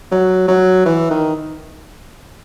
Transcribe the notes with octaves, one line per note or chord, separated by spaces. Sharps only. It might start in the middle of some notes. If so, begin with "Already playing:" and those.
F#3
F#3
E3
D#3